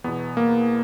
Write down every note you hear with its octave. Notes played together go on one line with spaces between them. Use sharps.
E2 B2 B3
A#3